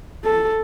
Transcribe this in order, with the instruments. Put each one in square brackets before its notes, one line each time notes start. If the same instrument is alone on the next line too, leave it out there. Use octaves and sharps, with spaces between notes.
[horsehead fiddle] A4